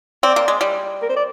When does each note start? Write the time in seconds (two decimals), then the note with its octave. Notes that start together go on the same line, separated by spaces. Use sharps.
0.23 C4 D5
0.36 A#3
0.48 G#3
0.61 G3
1.02 A#4
1.09 C5
1.16 D5